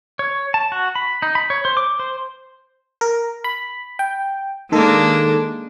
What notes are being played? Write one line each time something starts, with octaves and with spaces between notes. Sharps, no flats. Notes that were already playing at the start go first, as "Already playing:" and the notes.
C#5
A5
F#4
B5
D#4
B5
C#5
C5
D6
C5
A#4
B5
G5
D#3 G#3 A#3 D4 A4